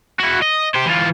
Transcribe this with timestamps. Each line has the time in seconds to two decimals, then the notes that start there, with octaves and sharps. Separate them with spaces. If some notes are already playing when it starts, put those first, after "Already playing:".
0.19 E4 F#4
0.41 D#5
0.74 G4 C5
0.86 E3 F4